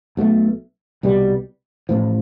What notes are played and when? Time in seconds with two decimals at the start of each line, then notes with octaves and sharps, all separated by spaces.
0.17 B1 B2 A3
1.03 C2 B2 G3
1.89 A1 A2 F3